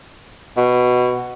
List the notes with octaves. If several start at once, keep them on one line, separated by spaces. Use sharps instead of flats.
B2